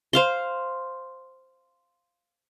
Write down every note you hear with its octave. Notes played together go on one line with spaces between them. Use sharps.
C5 F5 C6